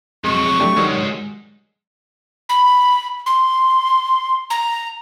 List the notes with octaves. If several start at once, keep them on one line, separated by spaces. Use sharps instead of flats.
F2 F#3 G#3 C#6
A3 D4 G4
G#2 D#3 F#3 G3
B5
C6
A#5